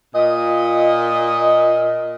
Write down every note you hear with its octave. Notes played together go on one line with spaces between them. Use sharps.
A#2 D#5